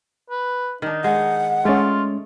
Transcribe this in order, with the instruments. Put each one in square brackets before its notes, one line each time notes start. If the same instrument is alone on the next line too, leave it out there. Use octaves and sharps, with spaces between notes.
[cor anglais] B4
[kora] D#3 D4 [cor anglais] D#4
[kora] G#3 [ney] F#5
[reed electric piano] G#3 C#4 [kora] A3 D5 D#5 [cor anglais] F4